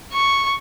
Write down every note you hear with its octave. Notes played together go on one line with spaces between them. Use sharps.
C#6